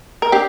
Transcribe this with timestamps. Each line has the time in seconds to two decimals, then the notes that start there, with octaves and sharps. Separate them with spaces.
0.22 A#4
0.32 D4 G4